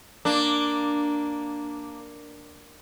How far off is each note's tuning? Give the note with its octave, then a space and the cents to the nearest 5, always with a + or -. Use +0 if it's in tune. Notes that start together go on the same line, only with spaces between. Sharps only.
A#3 +0 D4 +0